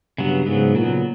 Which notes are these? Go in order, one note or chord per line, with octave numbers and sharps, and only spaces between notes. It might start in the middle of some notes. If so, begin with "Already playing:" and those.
G2 C#3 F#3 B3
G#2 C#3 F#3 B3
A#2 C#3 F#3 B3